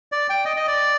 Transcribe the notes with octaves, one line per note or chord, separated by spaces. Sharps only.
D5
G5
D#5
D#5
D5